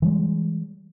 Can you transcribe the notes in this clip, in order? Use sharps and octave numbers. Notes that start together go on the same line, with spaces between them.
E3 G3 G#3